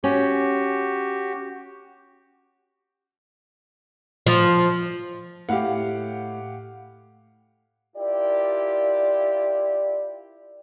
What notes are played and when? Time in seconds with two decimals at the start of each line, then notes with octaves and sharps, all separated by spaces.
0.04 C#4 F#4 G4
4.27 F3
5.49 A2 G4 F5 F#5
7.96 E4 F4 G4 A#4 D5